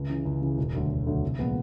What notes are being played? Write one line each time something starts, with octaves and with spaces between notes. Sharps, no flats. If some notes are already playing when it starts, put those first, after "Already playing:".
Already playing: C#2
C#3 E3
C#2
C#3 E3
E1
D2 D3 F#3
E1
D2 D3 F#3
C2
A#2 F3 G#3 B3